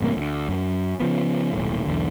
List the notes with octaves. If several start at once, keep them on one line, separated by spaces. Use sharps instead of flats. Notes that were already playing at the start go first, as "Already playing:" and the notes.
A1 G2 C3 A#3
D2
F#2
C#3 F3 B3
D#1 B1 A2
B1 E2 D3